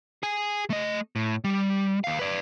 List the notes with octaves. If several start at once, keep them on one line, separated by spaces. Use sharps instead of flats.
G#4 G#5
A3 D#5
A2
G3
D#2 F5
B4 D5